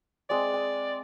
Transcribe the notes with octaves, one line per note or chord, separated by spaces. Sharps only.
G#3 C4 D5
G#5